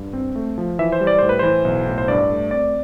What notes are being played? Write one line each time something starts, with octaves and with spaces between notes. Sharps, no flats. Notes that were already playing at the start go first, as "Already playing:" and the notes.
Already playing: G2
C4
A3
F3
E3 E5
C5
G3
D5
A2 C5
B4
E3 C5
B1
A2
C5
G2 D5
A3
C4 D5